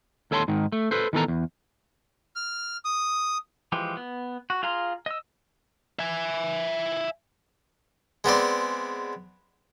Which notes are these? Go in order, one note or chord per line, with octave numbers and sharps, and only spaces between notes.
D#2 A4 C#5 A5 B5 C6
G#2 D#3
A3
A4 B4 C5
D#3 E3 B3 A4 A#5
E2
F6
D#6
E3 F3 G#3 G4
B3
F#4
F4 G#4 F5 A#5 C6
D#5 E6
E5 G#5
G#3 B3 C4 D5